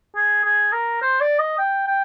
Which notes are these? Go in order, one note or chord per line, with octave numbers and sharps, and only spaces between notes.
G#4
G#4
A#4
C5
D5
D#5
G5
G5